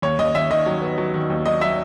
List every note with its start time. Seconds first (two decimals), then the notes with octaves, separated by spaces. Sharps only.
0.02 D#2 C#5
0.19 D#2 D#5
0.35 D#2 E5
0.50 D#3 D#5
0.66 F#3
0.82 B3
0.98 F#3
1.14 D#3
1.30 D#2
1.45 F#3 D#5
1.61 F#3 E5